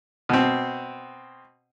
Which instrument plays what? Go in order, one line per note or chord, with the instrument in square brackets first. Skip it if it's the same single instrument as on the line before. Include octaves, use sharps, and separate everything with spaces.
[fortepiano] B2 C4